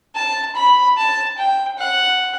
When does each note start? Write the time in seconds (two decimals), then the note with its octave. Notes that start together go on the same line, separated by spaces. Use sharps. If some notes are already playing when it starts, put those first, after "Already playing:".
0.15 A5
0.56 B5
0.98 A5
1.38 G5
1.79 F#5